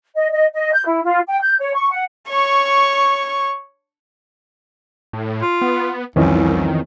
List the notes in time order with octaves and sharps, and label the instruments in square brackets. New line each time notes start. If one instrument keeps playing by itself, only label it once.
[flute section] D#5
D#5
D#5
G6
E4
F4
G5
G6
C#5
C#6
F#5
[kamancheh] C#5 C#6
[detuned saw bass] A2
[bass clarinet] F4
[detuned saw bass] B3
[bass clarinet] C2 [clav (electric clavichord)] F2 E3 C#4 [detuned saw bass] D#3